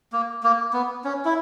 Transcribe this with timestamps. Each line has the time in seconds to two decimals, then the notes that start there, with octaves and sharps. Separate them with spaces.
0.13 A#3
0.43 A#3
0.73 B3
1.04 C#4
1.25 E4